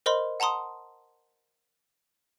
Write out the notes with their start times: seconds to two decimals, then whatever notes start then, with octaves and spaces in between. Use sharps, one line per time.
0.06 A#4 C5 D#5 B5 C6
0.40 F#5 A5 A#5 C6 D#6